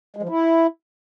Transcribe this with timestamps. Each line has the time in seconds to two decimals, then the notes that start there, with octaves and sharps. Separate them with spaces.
0.16 G#3
0.23 F3
0.29 E4